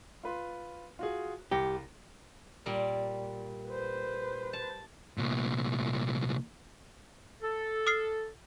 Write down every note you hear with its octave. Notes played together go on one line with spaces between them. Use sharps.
F4 B4 C6
F4 F#4 G#4
C2 G4 A#6 C#7
A#2 G3 A#4
B4 C5
A5
C2 A#2
A4
D#6 F6 C7